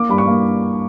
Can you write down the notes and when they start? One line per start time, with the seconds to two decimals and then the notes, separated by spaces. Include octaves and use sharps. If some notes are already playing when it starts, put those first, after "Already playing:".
Already playing: A#3 D6
0.09 G2 B5
0.18 C#6
0.27 A#3